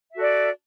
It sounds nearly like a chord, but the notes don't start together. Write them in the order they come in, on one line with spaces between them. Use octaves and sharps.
E5 F#4 A4 D5